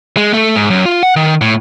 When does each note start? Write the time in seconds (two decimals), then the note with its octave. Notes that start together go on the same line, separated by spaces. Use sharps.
0.17 G#3
0.33 A3
0.56 G#2
0.70 F#2
0.86 F4
1.03 F#5
1.16 D#3
1.41 A2